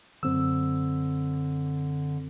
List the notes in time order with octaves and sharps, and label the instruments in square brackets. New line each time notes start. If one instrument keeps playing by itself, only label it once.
[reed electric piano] F#2 C4 E6 [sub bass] D3